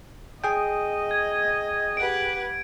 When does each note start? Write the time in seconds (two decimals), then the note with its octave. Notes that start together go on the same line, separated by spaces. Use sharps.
0.44 G#4 D#5 G5
1.11 G#6
1.97 G4 B4 F#5 D7